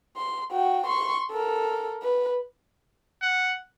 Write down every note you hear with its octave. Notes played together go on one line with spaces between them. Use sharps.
C6
F#4 G5
C6 C#6
A4 A#4
B4
F#5